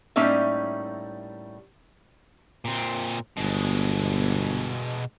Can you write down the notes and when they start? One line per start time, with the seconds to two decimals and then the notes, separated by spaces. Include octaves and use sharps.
0.16 A2 G3 A#3 C#4 D#4 E5
2.65 A#2 C4
3.37 G1 B2 G#3